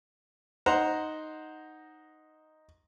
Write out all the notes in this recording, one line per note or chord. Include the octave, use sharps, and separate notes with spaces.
D#4 C5 F#5 A#5